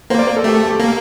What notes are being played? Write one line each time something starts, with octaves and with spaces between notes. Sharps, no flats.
A#3 C5
D5
C5
A4
A3 G4
G4
G4
A#3